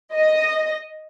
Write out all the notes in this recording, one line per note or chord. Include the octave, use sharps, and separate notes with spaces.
D#5